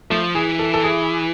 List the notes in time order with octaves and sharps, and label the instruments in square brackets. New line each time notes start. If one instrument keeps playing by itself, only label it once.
[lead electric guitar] F3 [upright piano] A3
[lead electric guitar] E3 [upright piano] G#4
[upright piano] A4
A4
G#4